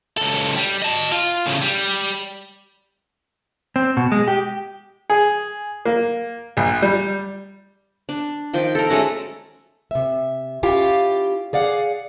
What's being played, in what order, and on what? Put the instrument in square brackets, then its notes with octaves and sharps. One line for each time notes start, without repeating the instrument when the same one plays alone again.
[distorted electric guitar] C#2 A4
G3
D#5 A5
F4
A2 C#3
G3
[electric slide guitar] C4
B2
G#3
G4
[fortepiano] G#4
A#3
A#1
G3
[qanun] D4
D#3 F3 G5
A4 A#4
G#3 A3 C#4 F#4
[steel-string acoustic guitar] C3 E5
C#4 E4 F4 G4 F5 G5
G#4 D5 F5 F#5